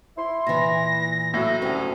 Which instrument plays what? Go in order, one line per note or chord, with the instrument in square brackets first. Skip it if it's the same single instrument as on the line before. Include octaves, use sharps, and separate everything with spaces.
[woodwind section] E4 C6
[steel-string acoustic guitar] A#2 E3 [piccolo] A#6
[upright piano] A2 F#3 [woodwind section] E5
[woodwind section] D2 [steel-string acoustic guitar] C#4 G4